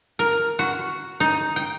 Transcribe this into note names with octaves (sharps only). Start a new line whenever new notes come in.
A#4
F#4
D#4
G5